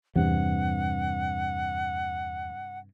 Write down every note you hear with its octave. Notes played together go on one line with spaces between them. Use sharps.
E2 G2 C3 F#5